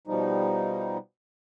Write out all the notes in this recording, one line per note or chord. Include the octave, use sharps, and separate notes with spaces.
B2 F3 G3 D#4